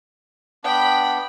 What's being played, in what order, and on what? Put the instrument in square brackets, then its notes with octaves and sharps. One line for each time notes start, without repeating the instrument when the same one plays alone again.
[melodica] B3 D4 [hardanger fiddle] G5 B5